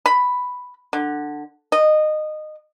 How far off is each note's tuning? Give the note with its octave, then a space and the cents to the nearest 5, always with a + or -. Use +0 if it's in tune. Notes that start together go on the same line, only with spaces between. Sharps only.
B5 +5
D3 +15
D#5 -20